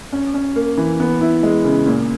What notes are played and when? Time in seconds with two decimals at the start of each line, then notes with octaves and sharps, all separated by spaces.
0.13 C#4
0.34 C#4
0.56 A#3
0.77 E3
1.00 B3
1.21 E4
1.43 G#3
1.65 C#3
1.86 A#2